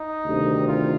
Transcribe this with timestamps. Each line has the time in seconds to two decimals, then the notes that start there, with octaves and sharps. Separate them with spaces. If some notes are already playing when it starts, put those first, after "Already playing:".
Already playing: D#4
0.24 D2 C3 D#3 G3
0.68 F4